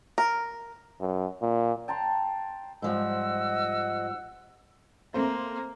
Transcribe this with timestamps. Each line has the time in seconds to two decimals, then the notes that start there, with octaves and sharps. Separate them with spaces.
0.18 A#4
1.01 F#2
1.42 A#2
1.88 G5 A5 A#5 C6
2.82 G#2 F3 G3 D#5 F#5 E6
5.14 A3 A#3 C4 C5